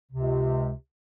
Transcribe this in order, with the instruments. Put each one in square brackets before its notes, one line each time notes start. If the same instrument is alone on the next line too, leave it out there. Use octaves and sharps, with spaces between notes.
[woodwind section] C#2 C3